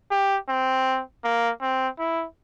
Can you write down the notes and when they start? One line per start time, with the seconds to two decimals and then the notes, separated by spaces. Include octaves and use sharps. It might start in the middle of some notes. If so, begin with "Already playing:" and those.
0.11 G4
0.48 C4
1.24 A#3
1.61 C4
1.99 E4